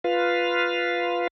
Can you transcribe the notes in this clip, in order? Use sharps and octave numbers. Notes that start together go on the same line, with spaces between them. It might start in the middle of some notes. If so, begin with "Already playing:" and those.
F4 B4 F5